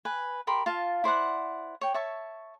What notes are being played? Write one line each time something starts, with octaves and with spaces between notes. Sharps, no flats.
B4 G#5
G4 A#4 B5 C6
F4 F5 A5
E4 C5 D5 F#5
C#5 G5
C#5 E5 A5 C#6